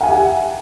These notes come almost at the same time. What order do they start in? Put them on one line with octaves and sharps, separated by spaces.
F#5 G#5 E5 G4